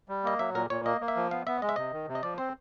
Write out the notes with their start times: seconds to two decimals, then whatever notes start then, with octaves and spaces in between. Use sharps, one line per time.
0.09 G3
0.24 A#3 D#5
0.39 F#3 E5
0.55 A#2 A#4
0.70 A#2 C#5
0.85 A#3 D#5
1.01 A#3
1.08 E5
1.16 F3
1.31 B3 F5
1.47 B3 E5
1.62 G#3 D#5
1.69 E5
1.76 C3 D#5
1.92 D#3
2.08 C3
2.15 D#5
2.23 F3 D5
2.38 C4 C5